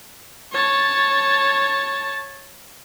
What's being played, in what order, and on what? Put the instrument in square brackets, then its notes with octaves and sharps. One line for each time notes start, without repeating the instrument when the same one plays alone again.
[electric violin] C#5 A5